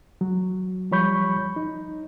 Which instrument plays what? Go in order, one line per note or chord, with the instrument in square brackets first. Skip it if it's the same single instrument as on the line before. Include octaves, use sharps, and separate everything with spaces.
[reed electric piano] F#3
F3 G3 C#5 B5 C#6 G6
D#4